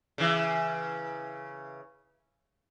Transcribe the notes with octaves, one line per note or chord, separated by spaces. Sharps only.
C#3 E3